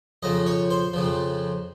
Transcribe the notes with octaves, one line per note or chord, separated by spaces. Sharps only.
F2 C#3 F3 D#5
C#5
C5
F2 C#3 F3